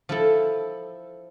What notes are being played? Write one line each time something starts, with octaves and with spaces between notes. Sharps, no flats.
F3 E4 A4